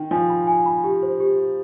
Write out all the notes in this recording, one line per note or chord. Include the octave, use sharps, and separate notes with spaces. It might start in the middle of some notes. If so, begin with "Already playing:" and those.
Already playing: D#3 G5
F3 G#5
B5
G#5
B5
G4
C5
G4
G4